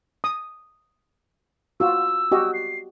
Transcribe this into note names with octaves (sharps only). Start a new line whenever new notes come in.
D#6
F4 F#4 E6
F#4 G4 D#5
C7